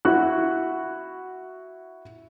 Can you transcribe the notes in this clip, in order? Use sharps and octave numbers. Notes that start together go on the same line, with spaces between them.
E4 F#4 F#6